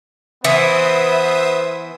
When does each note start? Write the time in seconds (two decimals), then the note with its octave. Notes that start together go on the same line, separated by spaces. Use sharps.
0.44 E3 B3 C5 E5 D#6